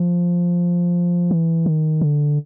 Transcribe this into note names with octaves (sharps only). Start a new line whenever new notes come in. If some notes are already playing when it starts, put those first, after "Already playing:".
Already playing: F3
E3
D#3
D3